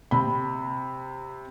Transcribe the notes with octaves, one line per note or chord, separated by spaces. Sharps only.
C3 B5